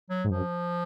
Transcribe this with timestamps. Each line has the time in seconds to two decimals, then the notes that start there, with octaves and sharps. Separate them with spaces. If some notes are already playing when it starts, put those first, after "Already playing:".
0.10 F#3
0.25 G#2
0.30 F#2 F3